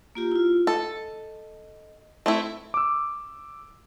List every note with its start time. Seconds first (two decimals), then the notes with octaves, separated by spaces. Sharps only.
0.15 A#3 F4 G4
0.32 E4 F4
0.67 A4 D#5
2.26 A3 C4 E4
2.74 D6 E6